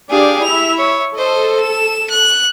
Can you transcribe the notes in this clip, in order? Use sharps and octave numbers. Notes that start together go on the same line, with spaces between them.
D4 G4 G#4 D5 F5
E4 E5 F7
C#5
A4 C5 D#5
E7
F#6